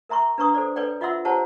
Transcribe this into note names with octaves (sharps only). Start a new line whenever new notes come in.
A#4 E5 A#5 C6 C#6
D4 B4 A#5 C#6 D#6
A4 C5 D5
A4 B4 C#5 D5 G5
F4 D#5 E5 F#5 C6 E6
G4 C5 C#5 F#5 A5 A#5